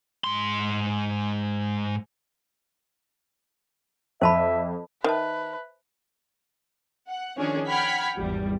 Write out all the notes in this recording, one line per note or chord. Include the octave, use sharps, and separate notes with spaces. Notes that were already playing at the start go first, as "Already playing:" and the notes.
G#2 C6
F2 C5 E5 A5 B5
D#3 B4 C5 E5 A5
F#5
D#3 F3 C#4 D4 G#4 C#5
F#5 G5 B5 F6 G#6 B6
G#1 E2 G3